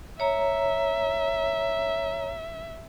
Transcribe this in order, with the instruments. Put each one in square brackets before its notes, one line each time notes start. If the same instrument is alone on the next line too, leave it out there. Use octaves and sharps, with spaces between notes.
[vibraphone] C#5 A#5 [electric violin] E5